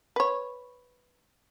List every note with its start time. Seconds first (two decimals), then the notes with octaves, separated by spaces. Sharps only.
0.16 B4 C#5